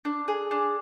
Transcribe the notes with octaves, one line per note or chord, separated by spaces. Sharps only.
D4
G#4
D4